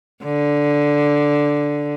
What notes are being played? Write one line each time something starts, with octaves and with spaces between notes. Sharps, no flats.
D3